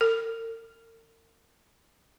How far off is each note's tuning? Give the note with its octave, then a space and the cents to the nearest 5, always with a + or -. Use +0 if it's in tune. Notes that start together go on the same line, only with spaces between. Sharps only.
A#4 -45